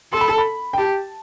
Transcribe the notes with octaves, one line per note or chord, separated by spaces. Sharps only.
A4 C6
B5
A5
B5
G5
G4 A5